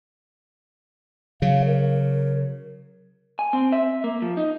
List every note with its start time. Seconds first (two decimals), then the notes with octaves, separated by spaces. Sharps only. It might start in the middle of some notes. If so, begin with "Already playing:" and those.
1.42 C#3 F#3 F5
1.66 A#4
3.39 G#5
3.53 C4
3.72 E5
4.04 A#3
4.22 F3
4.37 D#4